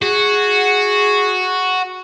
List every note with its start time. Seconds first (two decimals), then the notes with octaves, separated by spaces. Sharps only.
0.02 F#4 G#4